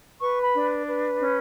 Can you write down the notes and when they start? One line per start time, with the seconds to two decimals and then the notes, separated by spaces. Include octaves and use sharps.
0.21 B4 C#6
0.42 B5
0.54 D4
0.87 B4
1.20 C#4